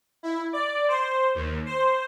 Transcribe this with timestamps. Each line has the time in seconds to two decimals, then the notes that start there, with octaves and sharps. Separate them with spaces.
0.23 E4
0.53 D5
0.88 C5
1.35 D#2
1.66 C5